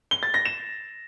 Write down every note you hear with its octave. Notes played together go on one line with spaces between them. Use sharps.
G7
A6
A#6
E7